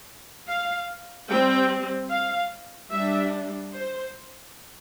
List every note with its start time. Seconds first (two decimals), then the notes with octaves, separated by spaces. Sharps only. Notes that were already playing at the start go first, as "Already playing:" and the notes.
0.48 F5
1.29 G3 C4 G5
2.11 F5
2.92 G3 D4 E5
3.74 C5